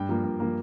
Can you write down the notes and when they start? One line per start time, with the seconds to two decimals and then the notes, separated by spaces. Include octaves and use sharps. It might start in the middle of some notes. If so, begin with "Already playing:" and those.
Already playing: G2 G5
0.09 F3 A#3
0.24 G2
0.40 F3 A#3